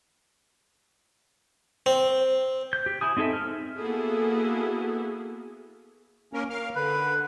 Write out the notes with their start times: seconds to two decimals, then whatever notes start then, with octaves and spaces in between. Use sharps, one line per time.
1.86 C4
2.73 G6
2.86 G4
3.01 E4 G#5 D#6
3.17 C4 D#4 G#4 A4 E5
3.33 F6
3.77 A#3 B3 E4 F#4 G#4 A4
6.33 A#3 C#4 A#4
6.50 A#4 F5 F6
6.75 D3 B4